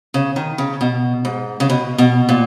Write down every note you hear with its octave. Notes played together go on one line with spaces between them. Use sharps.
C#3
D#3
C#3
B2
G#2
C#3
B2
B2
A#2